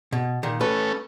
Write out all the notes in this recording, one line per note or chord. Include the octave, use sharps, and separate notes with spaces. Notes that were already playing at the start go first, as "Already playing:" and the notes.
B2
A#2 D#3
A3 C#4 A4 B4